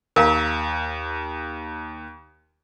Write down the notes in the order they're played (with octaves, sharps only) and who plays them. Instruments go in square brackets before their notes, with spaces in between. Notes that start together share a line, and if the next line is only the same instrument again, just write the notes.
[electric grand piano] D#2 [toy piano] A#4 F5 A#5